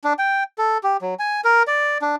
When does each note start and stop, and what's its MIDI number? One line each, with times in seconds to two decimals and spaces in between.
0.04 0.13 62
0.19 0.43 79
0.58 0.78 69
0.83 0.97 67
1.02 1.14 54
1.19 1.41 80
1.44 1.63 70
1.67 1.98 74
2.02 2.16 62